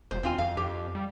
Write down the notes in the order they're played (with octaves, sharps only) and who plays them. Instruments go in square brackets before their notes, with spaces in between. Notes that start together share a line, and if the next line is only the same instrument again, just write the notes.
[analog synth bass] E1 [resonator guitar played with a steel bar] C5
[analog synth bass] D#2 [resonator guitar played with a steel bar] C4 F4 G#5
[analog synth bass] F2 [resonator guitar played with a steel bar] F5
[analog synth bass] F2 [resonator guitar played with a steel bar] G4
[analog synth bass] G3